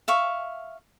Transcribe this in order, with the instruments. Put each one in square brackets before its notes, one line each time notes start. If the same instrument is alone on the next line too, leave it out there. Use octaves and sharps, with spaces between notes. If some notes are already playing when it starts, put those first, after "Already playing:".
[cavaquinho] E5 F5 C#6